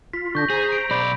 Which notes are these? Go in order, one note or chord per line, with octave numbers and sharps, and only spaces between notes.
F4 B6
D3 D4 C#6 G6 A#6
G#4 C5 A#5
D7
B1 D5 B5